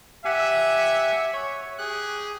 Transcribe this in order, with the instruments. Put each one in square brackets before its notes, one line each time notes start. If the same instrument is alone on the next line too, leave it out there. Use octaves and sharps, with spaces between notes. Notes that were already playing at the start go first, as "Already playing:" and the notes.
[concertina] G4 F#5 G#5 [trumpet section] E5
[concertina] C#5
[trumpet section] G4 G#4 [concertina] F#6